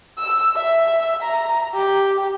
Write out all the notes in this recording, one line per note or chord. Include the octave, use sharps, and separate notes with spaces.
E6
E5
A#5
G4